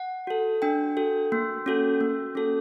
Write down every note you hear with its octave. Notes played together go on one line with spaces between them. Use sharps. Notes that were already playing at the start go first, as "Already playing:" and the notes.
Already playing: F#5
F#4 A4
D4 G5
F#4 A4
A#3
C#4 F#4 A4
A#3
C#4 F#4 A4